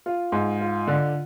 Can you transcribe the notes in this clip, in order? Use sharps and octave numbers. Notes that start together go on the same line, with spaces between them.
F4
G#2
F4
D3